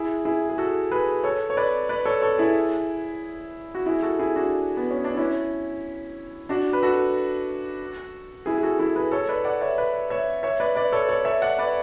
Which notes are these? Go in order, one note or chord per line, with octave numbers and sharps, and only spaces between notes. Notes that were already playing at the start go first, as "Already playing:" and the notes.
Already playing: E4 G#4
E4 G#4
G#4
F#4 A4
G#4 B4
A4 C#5
C#5
B4 D5
B4 D5
A4 C#5
A4 C#5
E4 G#4
F#4
E4 G#4
F#4 A4
E4 G#4
D4 F#4
B3
C#4
D4
C#4 E4
D4 F#4
B4
F#4 A4
E4 G#4
G#4
F#4 A4
E4 G#4
G#4 B4
A4 C#5
B4 D5
D5 F#5
C#5 E5
B4 D5
C#5 E5
C#5 E5
B4 D5
B4 D5
A4 C#5
A4 C#5
C#5 E5
D5 F#5
B4 D5